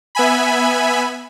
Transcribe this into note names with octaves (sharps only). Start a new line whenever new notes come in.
B3 E5 G#5 B5